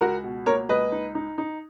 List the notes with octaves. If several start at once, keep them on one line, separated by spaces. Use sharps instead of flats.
C#2 F#4 A#4
B2
A#3 A#4 C#5
C#2 B4 D#5
D#4
D#4
D#4